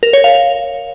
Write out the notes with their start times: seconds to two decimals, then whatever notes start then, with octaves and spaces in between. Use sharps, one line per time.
0.03 A#4
0.13 C#5
0.24 F5